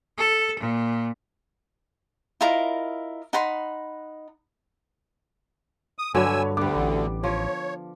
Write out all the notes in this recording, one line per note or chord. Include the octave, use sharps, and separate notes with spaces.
A4
A#2
E4 F4 A#4 D#5
D#4 F#5 B5 C6
D#6
G2 D3 F#3 C#5 G#5 B5 E6
D2 D3 G3 B3 D6
A1
F3 C#5